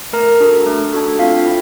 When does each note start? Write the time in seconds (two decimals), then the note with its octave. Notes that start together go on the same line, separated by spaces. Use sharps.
0.13 A3 A#4 A#5
0.40 D4 F#4 A4
0.66 A3
0.93 D4 F#4 A4
1.19 C4 F4 F5
1.46 E4